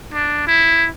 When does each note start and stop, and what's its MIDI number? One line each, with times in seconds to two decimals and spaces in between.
0.13 0.43 62
0.47 0.89 64